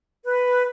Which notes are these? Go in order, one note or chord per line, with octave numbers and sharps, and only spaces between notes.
B4